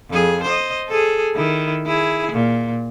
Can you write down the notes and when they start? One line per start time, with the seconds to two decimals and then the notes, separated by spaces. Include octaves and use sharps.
0.10 F2 G#4
0.44 C5 D#5
0.88 G#4 A4
1.35 D#3 E4
1.86 E4 G#4
2.32 A#2